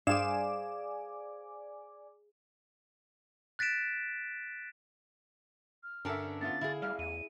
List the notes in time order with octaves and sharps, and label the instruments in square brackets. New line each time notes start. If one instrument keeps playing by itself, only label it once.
[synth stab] G2 E7 [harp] G#4 C5 F5 [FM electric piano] D5 G#5 D6
[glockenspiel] F#6 A6 B6 D7 E7
[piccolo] F6
[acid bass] G2 [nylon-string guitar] D3 C#4 A5 [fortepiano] A#4 E5
[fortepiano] B3 E4 F4 [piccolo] A6
[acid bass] D3 [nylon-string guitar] E4 G#4 [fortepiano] F5
[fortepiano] A1 F5 [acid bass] G3 [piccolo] F6
[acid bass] E2 [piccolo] D#7